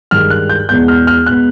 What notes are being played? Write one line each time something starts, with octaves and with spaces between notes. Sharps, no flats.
G2 D#3 G#3 F6
F#6
G6
E2 B2 G#3 B3 G6
F6
F6
B2 G#3 B3 F#6